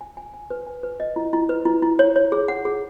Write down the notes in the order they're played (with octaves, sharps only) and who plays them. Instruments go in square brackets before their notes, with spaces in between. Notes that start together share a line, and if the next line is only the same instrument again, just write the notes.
[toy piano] G#5
G#5
G#5
B4
G#5
B4
D#5
E4
E4
B4
E4
E4
C#5
C#5
G#4
F#5
G#4